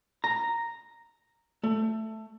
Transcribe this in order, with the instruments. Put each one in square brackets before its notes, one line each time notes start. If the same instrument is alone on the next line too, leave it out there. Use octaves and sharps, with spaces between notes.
[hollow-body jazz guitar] A#5
A3